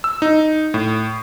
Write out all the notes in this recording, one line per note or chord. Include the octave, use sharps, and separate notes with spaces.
E6
D#4
A2